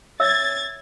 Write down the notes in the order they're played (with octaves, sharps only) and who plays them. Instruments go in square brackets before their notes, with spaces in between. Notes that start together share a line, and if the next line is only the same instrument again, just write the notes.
[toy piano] C#5 E5 E6 [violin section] G#6 A6